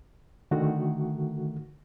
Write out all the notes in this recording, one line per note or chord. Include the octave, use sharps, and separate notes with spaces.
D3 D#3 A3 F#4